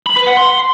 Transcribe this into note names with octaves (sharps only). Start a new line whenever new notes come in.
B5
B4
F#5
C6